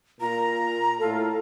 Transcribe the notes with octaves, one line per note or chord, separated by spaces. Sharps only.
A#2 F4 A#4 A#5
A2 F4 A4